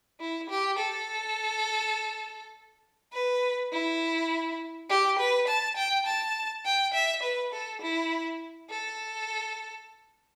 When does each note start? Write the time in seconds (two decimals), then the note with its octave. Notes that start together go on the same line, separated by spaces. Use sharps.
0.20 E4
0.50 G4
0.79 A4
3.13 B4
3.72 E4
4.90 G4
5.19 B4
5.48 A5
5.77 G5
6.07 A5
6.66 G5
6.94 E5
7.23 B4
7.53 A4
7.82 E4
8.70 A4